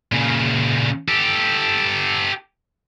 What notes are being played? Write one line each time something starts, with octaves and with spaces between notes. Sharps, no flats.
A#2 C#3
G4 A4